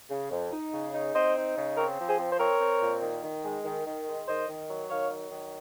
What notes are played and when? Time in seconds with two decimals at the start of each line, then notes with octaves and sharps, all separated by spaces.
0.10 C#3
0.31 F2
0.52 D#4
0.73 C#3
0.94 D#4
1.14 C4 C5 D#5
1.36 D#4
1.57 C#3
1.77 C4 A#4 C#5
1.99 F3
2.08 G#4 C5
2.19 C4
2.32 C5
2.39 C4 A#4 C#5
2.61 C4
2.82 A#2
3.02 D#3
3.24 D#3
3.45 G#3
3.65 D#3
3.86 D#3
4.07 G#3
4.27 D#3 C5 D#5
4.49 D#3
4.69 F#3
4.90 D#3 C#5 F5
5.11 F#3
5.32 D#3